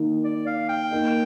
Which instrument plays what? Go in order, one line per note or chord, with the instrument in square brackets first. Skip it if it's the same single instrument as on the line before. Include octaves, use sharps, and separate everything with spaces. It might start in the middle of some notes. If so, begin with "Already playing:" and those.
Already playing: [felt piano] D#3 A#3 D#4
[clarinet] D5
F5
G5
[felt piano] A#3 D#4 A#4 D#5